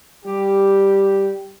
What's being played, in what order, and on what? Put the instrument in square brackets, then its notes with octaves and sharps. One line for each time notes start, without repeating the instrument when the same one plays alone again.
[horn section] G3 G4